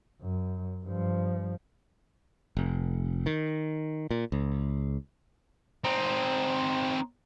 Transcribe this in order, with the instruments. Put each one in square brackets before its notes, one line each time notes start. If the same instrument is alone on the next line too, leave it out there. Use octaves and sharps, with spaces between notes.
[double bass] F#2
G2 F3
[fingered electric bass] F1
D#3
A#2
C#2
[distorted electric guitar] C4 D#4